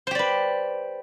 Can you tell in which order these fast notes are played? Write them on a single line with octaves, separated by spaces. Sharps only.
C5 G4 D5 B4